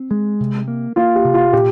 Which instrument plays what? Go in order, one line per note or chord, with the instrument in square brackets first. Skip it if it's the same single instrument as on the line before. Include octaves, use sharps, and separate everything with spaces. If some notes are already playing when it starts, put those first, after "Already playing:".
Already playing: [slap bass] C4
G#3
C3
A#3
[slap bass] A#3 [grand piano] F4
[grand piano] G4
[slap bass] C3
[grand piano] F4
[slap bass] A#2 [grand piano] G4